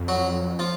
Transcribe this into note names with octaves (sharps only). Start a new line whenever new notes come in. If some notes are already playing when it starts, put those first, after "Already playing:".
Already playing: F2
F#3 F#4
F3 F4